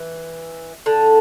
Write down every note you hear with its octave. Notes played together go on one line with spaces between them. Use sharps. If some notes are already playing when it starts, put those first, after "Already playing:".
Already playing: E3
D3